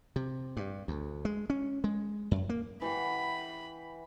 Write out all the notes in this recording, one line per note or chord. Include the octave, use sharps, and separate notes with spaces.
C3
G2
D2
G#3
C#4
G#3
F#2
A#3
E3 G4 F#5 B5